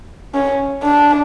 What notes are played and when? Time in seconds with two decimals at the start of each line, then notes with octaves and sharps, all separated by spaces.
0.34 C#4
0.83 D4